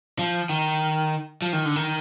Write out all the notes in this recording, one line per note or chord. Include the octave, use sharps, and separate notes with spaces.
F3
D#3
F3
D#3
D3
D#3